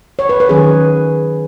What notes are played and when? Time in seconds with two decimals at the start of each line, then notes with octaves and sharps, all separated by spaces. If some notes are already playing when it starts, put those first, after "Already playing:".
0.19 C#5
0.29 B4
0.40 B4
0.49 D#3 F#3 C#4 G#4